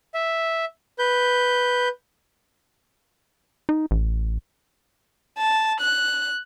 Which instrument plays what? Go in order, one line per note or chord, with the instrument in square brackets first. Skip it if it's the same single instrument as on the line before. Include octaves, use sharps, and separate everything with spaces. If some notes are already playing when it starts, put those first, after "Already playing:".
[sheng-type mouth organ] E5
B4 G6
[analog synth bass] D#4
A1
[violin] A5
F#6